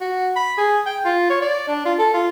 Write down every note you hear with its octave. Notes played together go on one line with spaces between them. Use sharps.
F#4
B5
G#4
G5
F4
C#5
D5
D4
F4
A4
F4